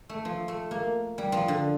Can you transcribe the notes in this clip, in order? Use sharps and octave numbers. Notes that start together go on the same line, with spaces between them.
A3
F3
A3
A#3
G3
F3
D3